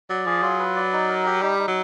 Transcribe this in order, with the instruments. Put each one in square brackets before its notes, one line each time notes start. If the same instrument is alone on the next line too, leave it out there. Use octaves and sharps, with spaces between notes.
[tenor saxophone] F#3 [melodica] D5
[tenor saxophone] F3 [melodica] G#4
[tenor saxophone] F#3 [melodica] F4
[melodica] B4
D5
D#4
A#4
G4
[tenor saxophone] G3 [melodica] D#4
[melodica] D#4
[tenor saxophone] F#3